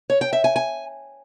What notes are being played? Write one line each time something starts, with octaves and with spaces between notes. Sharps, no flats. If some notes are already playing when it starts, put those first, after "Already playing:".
C#5
G5
E5
G#5
G#5